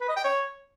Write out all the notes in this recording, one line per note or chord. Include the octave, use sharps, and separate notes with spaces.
B4
D#5
G5
C#5